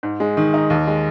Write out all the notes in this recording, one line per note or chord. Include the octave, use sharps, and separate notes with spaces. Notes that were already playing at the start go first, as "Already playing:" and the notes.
G#2
G#3
D#3
D#4
D#2
G#3